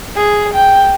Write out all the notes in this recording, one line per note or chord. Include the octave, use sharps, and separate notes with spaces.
G#4
G5